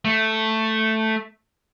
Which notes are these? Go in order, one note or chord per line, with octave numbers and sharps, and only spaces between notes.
A3